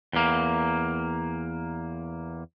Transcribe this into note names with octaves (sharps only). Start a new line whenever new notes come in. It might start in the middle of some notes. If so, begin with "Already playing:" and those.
E2 A#3